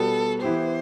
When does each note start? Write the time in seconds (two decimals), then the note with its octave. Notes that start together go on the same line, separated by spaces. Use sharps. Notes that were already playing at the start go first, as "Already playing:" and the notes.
Already playing: B2 G3 B3 A4
0.43 E3 B3 E4 G4 C5